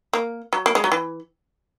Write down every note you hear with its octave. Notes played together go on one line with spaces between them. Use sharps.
A#3
F#3
A#3
G#3
F#3
E3